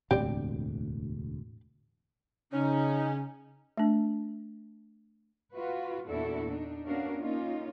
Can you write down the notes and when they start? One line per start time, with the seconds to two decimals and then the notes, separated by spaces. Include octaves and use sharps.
0.11 E1 D2 A2 C4 G4 D5
2.52 C#3 C#4 D#4
3.77 A3 D4
5.55 F4 F#4 B4
6.07 E2 A#2 D4 E4 F#4 A4
6.48 D4 D#4
6.85 B3 C#4 D4 F#4 A#4 F5
7.20 A#3 C#4 D#4 F4